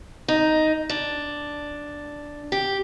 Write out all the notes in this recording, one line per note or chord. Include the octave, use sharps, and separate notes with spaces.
D#4
D4
G4